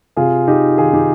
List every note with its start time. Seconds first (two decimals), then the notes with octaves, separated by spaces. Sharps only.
0.17 C3 F4 G#4
0.47 C3 D#4 G4
0.78 D#3 F4 G#4
0.93 D#4 G4